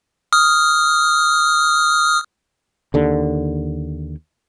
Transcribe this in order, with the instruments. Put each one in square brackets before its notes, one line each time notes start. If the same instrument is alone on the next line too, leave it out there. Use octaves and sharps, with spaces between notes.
[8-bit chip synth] D#6 F6
[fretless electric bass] D#2 D3